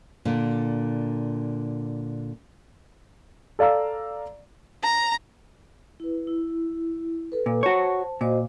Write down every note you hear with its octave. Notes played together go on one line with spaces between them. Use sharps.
A#2 D3
A4 D5 F5 A#5 E6
A#5
E4 B4
E4
A4 B4
A#2
F#4 C5 C#5 A5
A#2 F#4 C5 D#5